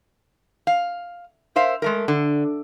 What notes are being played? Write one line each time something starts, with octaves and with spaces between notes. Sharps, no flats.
F5
A#4 C5 E5 F5
G#3 A3 A#4
D3